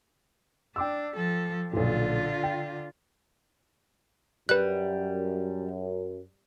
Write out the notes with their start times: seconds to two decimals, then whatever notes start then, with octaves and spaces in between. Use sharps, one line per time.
0.76 D4 G5 D6 E6
1.16 F3 A4
1.73 B1 A#2 D3 F4
2.43 G5
4.49 F#2 G3 B4 F#6